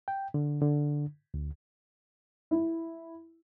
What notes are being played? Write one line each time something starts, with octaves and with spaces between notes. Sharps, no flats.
G5
D3
D3
D2
E4